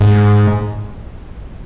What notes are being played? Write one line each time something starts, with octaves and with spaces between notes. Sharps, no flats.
G#2